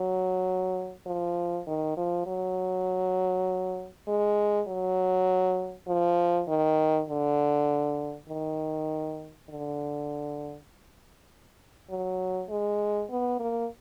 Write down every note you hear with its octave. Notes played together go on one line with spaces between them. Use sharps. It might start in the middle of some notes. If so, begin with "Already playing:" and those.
Already playing: F#3
F3
D#3
F3
F#3
G#3
F#3
F3
D#3
D3
D#3
D3
F#3
G#3
B3
A#3